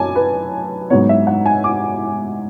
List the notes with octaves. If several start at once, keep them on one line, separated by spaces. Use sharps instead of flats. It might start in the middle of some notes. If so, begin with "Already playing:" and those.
Already playing: F#2 G#5 A5 D6
B4
G#2 F#3 B3 C#5
E5
F#5
G#5
D6